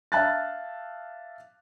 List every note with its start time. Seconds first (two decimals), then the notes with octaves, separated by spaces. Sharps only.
0.12 E5 F5 A5 F#6 A6